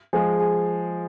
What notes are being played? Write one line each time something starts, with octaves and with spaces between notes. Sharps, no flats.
F3 G#3 G#4 G#5
G#4 G#5